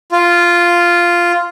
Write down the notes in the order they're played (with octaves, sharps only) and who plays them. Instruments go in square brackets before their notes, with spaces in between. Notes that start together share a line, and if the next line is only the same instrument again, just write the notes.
[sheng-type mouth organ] F4